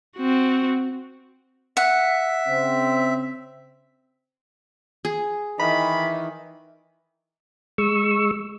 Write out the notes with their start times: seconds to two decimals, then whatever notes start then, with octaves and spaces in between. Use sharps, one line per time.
0.17 C4 F#4
1.77 E5 F#5
2.48 C#3 C4
5.05 G#4
5.59 D#3 E3 B5
7.78 G#3 C#6 E6